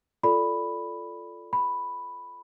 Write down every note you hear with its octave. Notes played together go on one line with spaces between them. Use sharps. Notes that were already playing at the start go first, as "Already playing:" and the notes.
F4 A4 D5 B5
B5